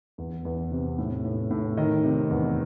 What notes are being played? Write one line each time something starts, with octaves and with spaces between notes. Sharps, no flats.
E2
E2
C3
A2
A2
A2
D#3 D#5
C3
E2